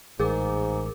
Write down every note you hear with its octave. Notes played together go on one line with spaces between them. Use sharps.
A1 G#2 G#4 A#4 D6